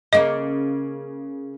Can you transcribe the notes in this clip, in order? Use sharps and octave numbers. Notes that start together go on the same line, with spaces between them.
C#3 A#3 D#5